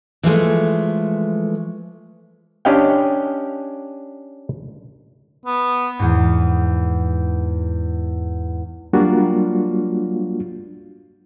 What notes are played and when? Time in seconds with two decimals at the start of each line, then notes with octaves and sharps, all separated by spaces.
0.23 E3 F3 G#3 A3
2.65 C#4 D4 G4 D#5 F5 G5
5.45 B3
5.99 E2 G#2
8.93 F#3 G3 A#3 D4 F4 F#4